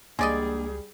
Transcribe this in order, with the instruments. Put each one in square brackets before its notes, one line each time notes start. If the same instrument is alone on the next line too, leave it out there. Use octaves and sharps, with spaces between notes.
[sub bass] C#2 [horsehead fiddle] G3 G#4 [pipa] G#3 D5 D#5 [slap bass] A#3 D4